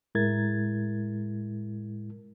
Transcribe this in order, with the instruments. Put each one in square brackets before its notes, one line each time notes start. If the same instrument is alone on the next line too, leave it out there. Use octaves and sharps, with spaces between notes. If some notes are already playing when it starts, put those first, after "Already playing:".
[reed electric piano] A2 G#3 E4 A#4 G#6 A6